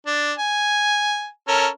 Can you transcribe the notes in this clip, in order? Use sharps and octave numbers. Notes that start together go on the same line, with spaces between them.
D4
G#5
C#4 A4 A#4